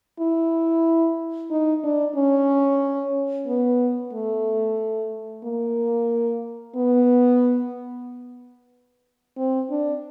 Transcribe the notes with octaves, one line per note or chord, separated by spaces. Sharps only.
E4
D#4
D4
C#4
B3
A3
A#3
B3
C4
D4